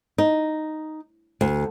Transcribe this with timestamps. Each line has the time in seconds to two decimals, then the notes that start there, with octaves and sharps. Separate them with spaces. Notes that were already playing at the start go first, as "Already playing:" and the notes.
0.18 D#4
1.41 D2